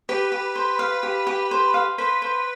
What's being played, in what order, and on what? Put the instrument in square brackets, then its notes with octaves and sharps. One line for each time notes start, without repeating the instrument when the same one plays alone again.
[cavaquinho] G4 [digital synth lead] B4
[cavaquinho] G4
C5
F5
G4
G4
C5
F5
[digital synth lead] B4 [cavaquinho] C5
[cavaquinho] C5